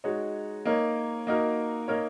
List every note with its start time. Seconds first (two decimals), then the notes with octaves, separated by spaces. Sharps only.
0.04 G#3 D#4 F#4 C#5
0.65 A#3 D#4 A#4 C#5
1.27 A#3 D#4 F#4 A#4
1.88 A#3 D#4 A#4 C#5